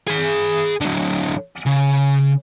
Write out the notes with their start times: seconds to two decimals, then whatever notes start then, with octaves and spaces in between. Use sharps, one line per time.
0.07 G#4 B5
0.81 D3 F#3
1.66 C#3